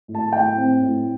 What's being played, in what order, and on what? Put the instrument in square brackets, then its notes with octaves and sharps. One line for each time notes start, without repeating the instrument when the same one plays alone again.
[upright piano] A2
A5
A2 G5
C4
A2